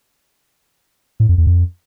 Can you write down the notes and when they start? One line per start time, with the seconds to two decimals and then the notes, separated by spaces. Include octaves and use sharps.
1.20 A2
1.29 F2
1.38 E2
1.47 F2